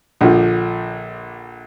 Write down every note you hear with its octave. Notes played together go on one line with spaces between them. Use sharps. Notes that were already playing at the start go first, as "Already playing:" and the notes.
A#1 D3 F3